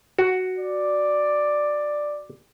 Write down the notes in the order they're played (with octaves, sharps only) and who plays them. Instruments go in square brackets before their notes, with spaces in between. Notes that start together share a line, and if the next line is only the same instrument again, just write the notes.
[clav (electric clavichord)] F#4
[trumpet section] D5